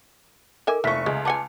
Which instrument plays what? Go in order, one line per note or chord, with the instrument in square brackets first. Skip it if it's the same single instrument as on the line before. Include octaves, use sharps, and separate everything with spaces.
[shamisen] D#3 E5 G#5 [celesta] A4 A#4 D6
[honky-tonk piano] F1 C#6 [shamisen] E3 F3 [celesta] E5 B6
[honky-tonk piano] C#2 [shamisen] G#3
[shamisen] B4 F#5 G#5 [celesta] A5 D6 C#7